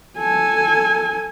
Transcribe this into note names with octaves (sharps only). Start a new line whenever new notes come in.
A4 G#5